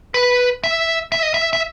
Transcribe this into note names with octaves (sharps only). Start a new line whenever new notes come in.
B4
E5
E5
D#5
E5
E5